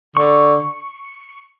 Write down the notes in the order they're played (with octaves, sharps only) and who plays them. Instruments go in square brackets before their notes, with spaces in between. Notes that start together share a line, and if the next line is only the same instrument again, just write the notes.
[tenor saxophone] D3 [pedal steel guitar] C#6